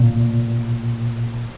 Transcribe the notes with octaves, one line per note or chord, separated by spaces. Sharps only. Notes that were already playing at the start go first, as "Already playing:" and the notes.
Already playing: A#2